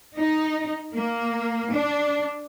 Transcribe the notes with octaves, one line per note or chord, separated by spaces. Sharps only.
D#4
A#3
D4